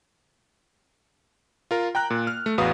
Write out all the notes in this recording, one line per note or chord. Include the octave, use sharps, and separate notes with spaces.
F4 A#4
G5 A#5 F#6
A#2
F6
A3
A1 E2 F#4 B4 F5 D#6